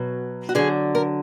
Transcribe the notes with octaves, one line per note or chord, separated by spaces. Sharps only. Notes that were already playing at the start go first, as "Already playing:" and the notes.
Already playing: B2 F#3
F#4
D3 F#3 G#4
A#4